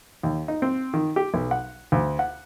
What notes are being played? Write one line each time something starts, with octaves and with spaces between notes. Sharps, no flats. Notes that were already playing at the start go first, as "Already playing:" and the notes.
D#2
D#4
C4
D#3
G4
B1
F#5
D2
F#5